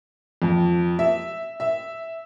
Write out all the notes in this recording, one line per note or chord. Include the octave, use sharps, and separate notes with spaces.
F2
E5
E5